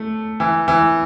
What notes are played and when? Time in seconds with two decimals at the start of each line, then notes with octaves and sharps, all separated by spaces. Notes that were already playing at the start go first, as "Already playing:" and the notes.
Already playing: A3
0.40 E3
0.68 E3